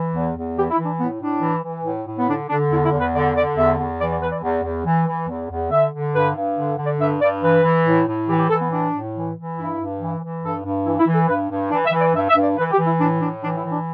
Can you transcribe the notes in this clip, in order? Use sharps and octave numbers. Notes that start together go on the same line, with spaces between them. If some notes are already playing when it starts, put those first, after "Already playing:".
Already playing: E3
E2
E2
E3 G4
E4
E3
D4
A2 B3
A2 D4
E3
E3
A2
A2
B3
D3 D4
D3 D4
E2 E4
E4
E2
B4
D3 D5
D3 D5
E2 E5
E2
E3 D5
D5
E3 B4
D5
E2
E2
E3
E3
E2
E2
D3 E5
D3
G2 B4
G2
D3
D3
D5
G2 E5
G2 D5
E3 B4
E3
A2
A2
E3 G4
G4
E3 A4
B3
A2 D4
A2
E3
E3
G2 E4
G2
E3
E3
G2 A4
G2
E3 E4
E4
E3
A4
G2 B4
G2
E3 D4
E5
E3
D5
G2 E5
E5
G2
D5
E3 B4
G4
E3
E4
A2 D4
A2 D4
E3 D4
E4
E3
D4